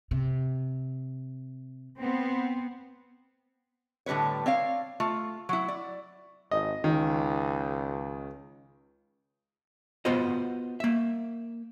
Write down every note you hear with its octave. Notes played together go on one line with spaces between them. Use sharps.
C3
B3 C4
A2 D3 G3 B4 C#5
C4 C#5 D5 F5
A3 F4
F#3 E4
D5
G#1 D#5
C#2 D#3
B3 F4 F#4 B4 C5 D#5
A#3 E5